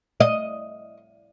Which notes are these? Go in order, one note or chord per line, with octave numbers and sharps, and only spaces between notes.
D#5